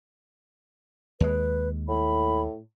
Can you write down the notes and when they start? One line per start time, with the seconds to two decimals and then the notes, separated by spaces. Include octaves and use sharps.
1.20 D#2 G#3 B4
1.89 A2 B5